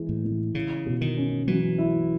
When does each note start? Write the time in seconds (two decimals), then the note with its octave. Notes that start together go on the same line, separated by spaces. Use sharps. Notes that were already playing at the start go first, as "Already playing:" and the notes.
Already playing: E3 G#3
0.09 A2
0.25 E3
0.55 C#3 E4
0.86 B2
1.01 D#3
1.17 C#4
1.47 E3 F#3
1.78 E4